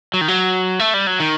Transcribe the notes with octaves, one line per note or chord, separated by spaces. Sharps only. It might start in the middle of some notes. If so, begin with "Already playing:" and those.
F#3
D#3
F#3
A3
G3
F#3
D#3